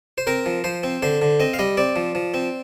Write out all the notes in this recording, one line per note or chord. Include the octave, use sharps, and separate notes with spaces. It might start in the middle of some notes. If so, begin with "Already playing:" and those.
C5
C4 A#4
F3
F3 C5
C4
D3 C5
D3
C4 D#5
F5
G3 D#5
C4 D5
F3
F3
C4